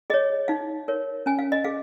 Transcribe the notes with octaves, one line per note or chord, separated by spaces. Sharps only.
G#4 C#5 D#5
D#4 F5
A#4 C#5
C#4 G#5
F5
D#5
G#4 F5